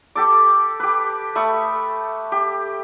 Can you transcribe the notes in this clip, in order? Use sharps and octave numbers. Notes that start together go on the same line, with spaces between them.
G4 A4 D6
G4 B4
A3 B5 C#6 D#6
G4